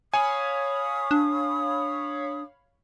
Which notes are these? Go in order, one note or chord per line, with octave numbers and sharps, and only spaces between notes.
C#5 F5 G#5 B5 D#6
D4